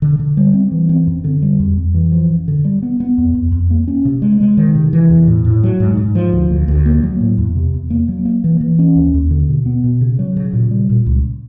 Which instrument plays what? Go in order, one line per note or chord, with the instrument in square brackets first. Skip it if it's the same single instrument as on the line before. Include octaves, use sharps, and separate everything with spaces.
[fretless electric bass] D3
D3
G3
C4
E3
C4
F#2
D3
G3
F2
F2
E3
F3
F#2
D3
G3
B3
B3
F2
F2
F2
A#3
C#4
C3
G#3
G#3
D#3
C3
E3
E2
A2
A2
F#3
G#2
G#2
F3
D2
D2
D2
A#3
F#3
A2
E2
C3
E2
A#3
F#3
A#3
E3
E3
C#4
D#2
D#2
D3
B2
B3
B2
C#3
F#3
C#3
A#2
G3
A#2
C#2